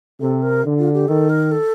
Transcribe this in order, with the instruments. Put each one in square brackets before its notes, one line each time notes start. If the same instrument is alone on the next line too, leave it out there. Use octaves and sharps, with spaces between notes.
[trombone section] C3 [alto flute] A4
[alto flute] A#4
[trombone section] D3
[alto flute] F4
G4
[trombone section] D#3 [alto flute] A4
[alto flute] A#4
A4